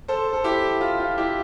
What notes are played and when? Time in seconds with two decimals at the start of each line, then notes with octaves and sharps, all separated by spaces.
0.08 A4 C5
0.33 A4
0.44 E4 G4
0.81 F4
0.99 F4
1.18 E4 G4